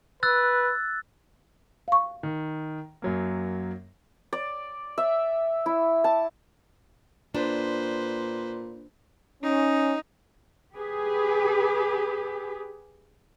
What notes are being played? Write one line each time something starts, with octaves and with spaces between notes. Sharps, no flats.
B4 E6 F#6 A6
F5 C#6
D#3
F#2 F#3 A#3
D5
E5
E4
A5
A#2 D4 B4 C5
C#4 D#4
G4 G#4 B4